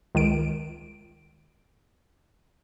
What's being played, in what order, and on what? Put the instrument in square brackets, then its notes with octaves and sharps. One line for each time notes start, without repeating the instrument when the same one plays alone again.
[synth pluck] C#2 D#3 D7